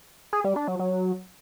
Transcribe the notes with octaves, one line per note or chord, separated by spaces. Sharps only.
G#4
G3
D4
F#3
F#3